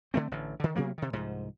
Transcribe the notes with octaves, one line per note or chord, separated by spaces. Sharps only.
D3 A3 C4
A1 D3
D3 D#3
C3 F#3 A#3 B3
C3 D#3
C2 G#2 F3